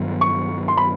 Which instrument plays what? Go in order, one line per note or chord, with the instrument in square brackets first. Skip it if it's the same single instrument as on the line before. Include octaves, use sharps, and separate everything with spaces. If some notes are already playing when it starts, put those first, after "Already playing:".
Already playing: [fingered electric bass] G2 D#3 F#3 B3
[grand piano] C#6
C6
B5